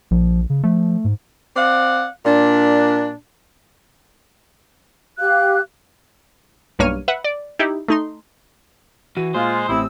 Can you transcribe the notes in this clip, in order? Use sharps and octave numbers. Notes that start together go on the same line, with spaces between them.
A#1 F3
C#3
F3 A3
G#2
C4 D5 F5 F#5
A#2 D4
G4 F5 F#6
B1 G2 A#3 C#5 F6 D#7
B4 E5 F#5
D5
D#4 E4 G4
A3 D#4 C6
E3 F#4 D#7
A#2 G#3 F4 C5
A1 C3 C4 E4 D#6 E6